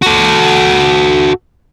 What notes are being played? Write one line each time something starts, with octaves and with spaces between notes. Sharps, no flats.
F#4 A4